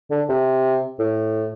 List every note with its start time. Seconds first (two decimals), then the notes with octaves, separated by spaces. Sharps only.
0.11 D3
0.29 C3
0.99 A2